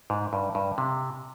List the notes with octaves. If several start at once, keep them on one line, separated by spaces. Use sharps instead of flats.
G#2
G2
G2
C3